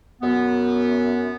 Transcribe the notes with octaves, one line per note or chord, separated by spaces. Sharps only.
F#2 B3